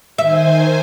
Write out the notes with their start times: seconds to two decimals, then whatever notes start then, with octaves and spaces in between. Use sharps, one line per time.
0.18 D#3 C5 E5 G#5